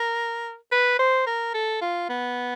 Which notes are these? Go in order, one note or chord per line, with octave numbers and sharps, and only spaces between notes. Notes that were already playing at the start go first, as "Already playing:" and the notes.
Already playing: A#4
B4
C5
A#4
A4
F4
B3